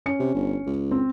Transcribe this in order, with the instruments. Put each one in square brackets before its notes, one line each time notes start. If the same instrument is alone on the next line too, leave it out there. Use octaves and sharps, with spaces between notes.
[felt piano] C#4 C#7
[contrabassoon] C3
G1
C#2
[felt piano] C4